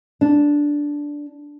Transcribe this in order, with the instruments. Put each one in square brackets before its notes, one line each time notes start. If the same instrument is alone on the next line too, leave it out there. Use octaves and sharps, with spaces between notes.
[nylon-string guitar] D4